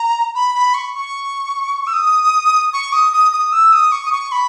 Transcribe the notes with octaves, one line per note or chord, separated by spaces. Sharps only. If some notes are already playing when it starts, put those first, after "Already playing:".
Already playing: A#5
B5
B5
C#6
C#6
E6
D#6
C#6
D#6
D#6
D#6
E6
D#6
C#6
D#6
C#6
B5